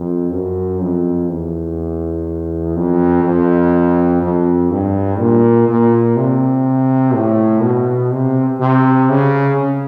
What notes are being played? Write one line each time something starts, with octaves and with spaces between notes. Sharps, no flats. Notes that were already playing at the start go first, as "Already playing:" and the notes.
Already playing: F2
F#2
F2
E2
F2
F2
F2
G2
A#2
A#2
C3
A2
B2
C3
C3
C#3